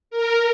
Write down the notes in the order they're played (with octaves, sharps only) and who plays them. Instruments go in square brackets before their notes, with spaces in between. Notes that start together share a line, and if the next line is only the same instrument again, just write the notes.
[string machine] A#4